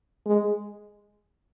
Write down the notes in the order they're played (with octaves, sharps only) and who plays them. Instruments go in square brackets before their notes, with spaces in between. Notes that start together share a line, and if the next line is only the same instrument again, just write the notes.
[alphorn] G#3